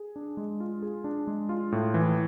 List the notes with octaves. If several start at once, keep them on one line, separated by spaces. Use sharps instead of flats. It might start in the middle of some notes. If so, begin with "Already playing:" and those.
Already playing: G#4
D4
G#3
F4
G#4
D4
G#3
F4
A2
E3